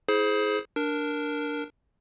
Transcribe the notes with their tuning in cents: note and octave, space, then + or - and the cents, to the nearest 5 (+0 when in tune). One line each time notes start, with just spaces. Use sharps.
E4 -25 G#4 +25 C5 +0
D4 +0 A#4 +0